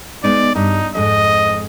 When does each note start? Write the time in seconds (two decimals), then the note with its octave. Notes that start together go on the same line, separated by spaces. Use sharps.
0.24 G#3 B3 D#4 D5
0.56 G2 D#4
0.95 F2 G#2 D#5